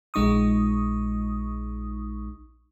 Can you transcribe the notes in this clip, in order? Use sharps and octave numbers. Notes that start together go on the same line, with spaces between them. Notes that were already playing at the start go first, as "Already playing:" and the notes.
A#1 G#3 D#4 C#6 D#6